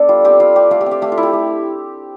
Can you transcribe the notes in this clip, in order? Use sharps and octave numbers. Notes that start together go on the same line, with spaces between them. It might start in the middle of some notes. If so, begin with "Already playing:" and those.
Already playing: B3 D4 A4 D5
G3 F4
C4 G4
G3 F4
C4 G4
A3 F4
G4
C4
G4
A3 G4
F4
E4
G4
A3